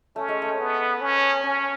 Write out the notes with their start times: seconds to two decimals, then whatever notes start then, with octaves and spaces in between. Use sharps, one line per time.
0.16 A3 C#4
0.29 G#3
0.42 A3
0.58 B3
1.01 C#4
1.44 C#4